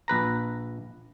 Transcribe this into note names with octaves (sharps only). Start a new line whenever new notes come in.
A#1 B4 A#5